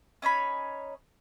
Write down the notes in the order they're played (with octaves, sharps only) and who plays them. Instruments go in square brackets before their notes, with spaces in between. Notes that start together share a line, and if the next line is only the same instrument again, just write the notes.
[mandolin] C#4 D#4 C#5 B5